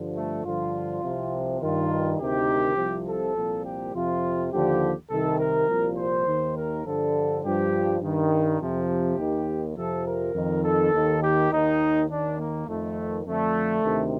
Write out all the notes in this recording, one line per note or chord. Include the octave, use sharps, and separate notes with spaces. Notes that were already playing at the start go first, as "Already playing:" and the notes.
Already playing: G2 D3 F3
A3
G2 D3 F3 F4
C2 C3 F3
G2 D#3 F4
D2 C3 D#3 G4
C2 C3 F3
A4
C2 A#2 F3
G4
F2 C3 F3 F4
D#2 D3 F3 G4
C2 C3 D#3 A4
A#4
C2 A#2 F3
C5
D#2 D#3
A#4
G2 D3 F3 A4
G2 F3 G4
G2 D#3
F2 C3 F3
G4
D#2 D#3
F2 C3 F3 A4
A#4
F2 D#3
A4
D#2 D#3
G4
D#2 D#3 D#4
D#2 D#3 D4
A#3
F2 D#3 A3
F2 D3 F3 A3
D2 C3 D#3